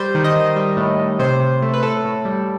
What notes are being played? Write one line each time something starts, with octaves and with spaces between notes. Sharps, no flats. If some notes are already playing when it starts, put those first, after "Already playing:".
Already playing: G3 C5
D#3
D#5
D#3
G3
A2
A2
C3 C5
C3
A3
B4
A2 A4
A2
G3